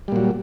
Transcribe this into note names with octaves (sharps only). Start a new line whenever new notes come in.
A#2 F#3 G3